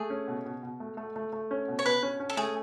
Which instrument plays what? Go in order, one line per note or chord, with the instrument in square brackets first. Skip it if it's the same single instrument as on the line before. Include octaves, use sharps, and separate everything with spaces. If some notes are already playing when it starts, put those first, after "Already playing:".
Already playing: [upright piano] A3 [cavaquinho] G#4
[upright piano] C#4
B2
B2
B2
A3
A3
A3
A3
C#4
B2
[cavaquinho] C#5
[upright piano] B2 [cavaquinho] B4
[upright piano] C#4
C#4
[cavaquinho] A4
[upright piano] A3 [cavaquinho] G#4